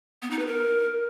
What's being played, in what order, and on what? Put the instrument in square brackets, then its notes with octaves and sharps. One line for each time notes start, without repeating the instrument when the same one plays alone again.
[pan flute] B3
D#4
B4
A#4